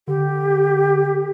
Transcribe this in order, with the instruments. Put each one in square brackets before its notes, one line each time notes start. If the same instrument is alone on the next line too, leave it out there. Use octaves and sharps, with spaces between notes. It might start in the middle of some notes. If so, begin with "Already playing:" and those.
[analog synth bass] D3 [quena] G4